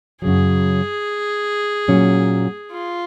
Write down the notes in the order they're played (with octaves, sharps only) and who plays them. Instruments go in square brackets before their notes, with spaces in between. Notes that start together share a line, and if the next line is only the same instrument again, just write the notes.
[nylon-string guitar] F#2 C#3 F#3 [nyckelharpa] G#4
[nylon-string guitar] A#2 F#3 C#4
[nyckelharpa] F4